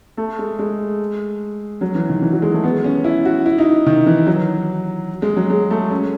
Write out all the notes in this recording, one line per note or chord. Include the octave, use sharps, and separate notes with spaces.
A3
G#3
G#3
F#3
E3
D#3
E3
F#3
G#3
A3
B3
C#4
E4
F#4
E4
D#4
D#3
E3
F#3
G#3
F#3
G#3
A3
C#4